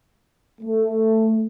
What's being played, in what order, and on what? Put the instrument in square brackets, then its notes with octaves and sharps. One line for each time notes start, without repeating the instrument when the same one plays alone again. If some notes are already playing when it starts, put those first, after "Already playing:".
[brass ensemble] A3